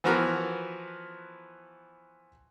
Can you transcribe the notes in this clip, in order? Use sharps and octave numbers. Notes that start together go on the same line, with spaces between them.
E3 F3 B3 F#4 A#4